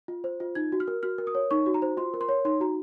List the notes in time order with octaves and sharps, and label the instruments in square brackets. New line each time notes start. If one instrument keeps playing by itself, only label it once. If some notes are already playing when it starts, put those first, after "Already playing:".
[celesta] F4
C5
F4
D#4 G#6
F#4
F6
A#4
F#4 F6
A#4
D#6
C#5
D#4 C#6
F#4
A#5
C5
F4 C6
A#4
C6
C#5
D#4 C6
F#4 A#5